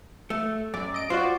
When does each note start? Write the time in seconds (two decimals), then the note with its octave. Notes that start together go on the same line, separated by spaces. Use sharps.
0.30 A3
0.74 F#2 D5
0.94 D#5 D7
1.10 F4 F#4 C5 D5